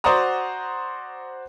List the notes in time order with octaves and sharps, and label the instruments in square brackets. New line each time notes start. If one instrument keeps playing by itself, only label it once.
[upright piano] F#4 C5 D5 F#5 A#5 D#6